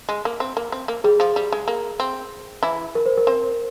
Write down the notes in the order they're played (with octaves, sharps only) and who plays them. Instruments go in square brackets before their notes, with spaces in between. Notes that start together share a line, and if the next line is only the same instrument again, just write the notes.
[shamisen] G#3
A#3
C4
A#3
C4
A#3
[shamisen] G3 [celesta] G#4
[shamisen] F3
G3
G#3
A#3
C4
E3 E4
[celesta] A#4
C5
A#4
[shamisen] C4 C5